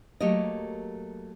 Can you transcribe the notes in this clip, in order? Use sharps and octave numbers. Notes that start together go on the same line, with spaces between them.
F#3 A3 A#3 G4 A#4 D#5